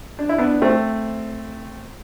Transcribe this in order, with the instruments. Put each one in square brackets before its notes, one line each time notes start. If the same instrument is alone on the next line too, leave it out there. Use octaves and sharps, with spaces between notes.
[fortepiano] D4
E4
B3 D4
A3 C4